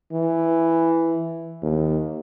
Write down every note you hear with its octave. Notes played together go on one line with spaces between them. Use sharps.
E3
D#2